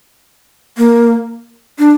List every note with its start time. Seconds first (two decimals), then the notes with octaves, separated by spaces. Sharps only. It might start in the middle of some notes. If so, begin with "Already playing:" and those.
0.78 A#3
1.79 D4